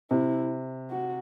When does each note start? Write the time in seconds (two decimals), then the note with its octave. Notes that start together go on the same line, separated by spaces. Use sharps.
0.11 C3 E4
0.90 F#4